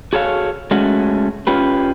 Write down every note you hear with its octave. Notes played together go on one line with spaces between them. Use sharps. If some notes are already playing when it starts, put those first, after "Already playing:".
F#4 G#4 A4 C#5 F5
G#3 A3 C#4 F#4
C#4 F4 G4 B4